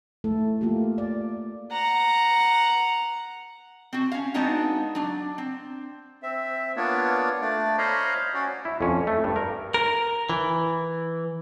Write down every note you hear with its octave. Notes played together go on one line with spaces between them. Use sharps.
A3 E4 A4
A3 A#3 F4 G4
D5
F#5 A#5
C4 F#4
C#4 F5
G#3 B3 C4 D4 D#4 F#4
F#3 D4
C4
C4 E5
A#3 B3 D4 F4 C#5 D5
A3 D4 D5
C5 C#5 D#5 F5 A#5 B5
C#4 F#4 C#5 D5
E4
F2 C#4
A3
G2
A#4
A#4
E3